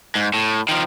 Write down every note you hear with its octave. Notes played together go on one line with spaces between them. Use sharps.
G#2
A2
D#3 F3